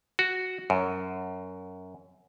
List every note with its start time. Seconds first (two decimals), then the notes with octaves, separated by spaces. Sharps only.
0.19 F#4
0.70 F#2